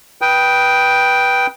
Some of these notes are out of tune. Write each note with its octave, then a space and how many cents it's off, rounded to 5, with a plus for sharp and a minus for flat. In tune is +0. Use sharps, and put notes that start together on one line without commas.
B4 -15 G5 +0 D#6 +10